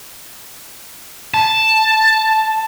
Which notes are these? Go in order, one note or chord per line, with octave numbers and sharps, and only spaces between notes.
A5